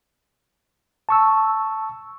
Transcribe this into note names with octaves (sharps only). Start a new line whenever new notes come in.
A5 C#6 E6